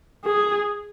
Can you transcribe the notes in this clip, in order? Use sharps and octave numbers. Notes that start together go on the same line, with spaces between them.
G#4